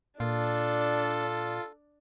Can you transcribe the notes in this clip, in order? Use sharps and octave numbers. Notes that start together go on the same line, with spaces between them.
A#2 D4 F4 A4